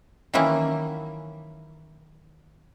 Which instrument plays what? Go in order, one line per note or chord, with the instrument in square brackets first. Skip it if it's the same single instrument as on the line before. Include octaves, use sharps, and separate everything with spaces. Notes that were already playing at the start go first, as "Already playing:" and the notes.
[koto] D#3 E3 F#3 A#3 C#4 E4